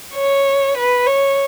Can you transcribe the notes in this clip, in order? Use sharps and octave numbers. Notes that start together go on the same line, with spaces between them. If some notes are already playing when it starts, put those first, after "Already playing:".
C#5
B4
C#5